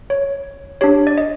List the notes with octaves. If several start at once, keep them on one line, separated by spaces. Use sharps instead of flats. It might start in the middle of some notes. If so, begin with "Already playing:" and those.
C#5
D4 G4 C#5
D5
D#5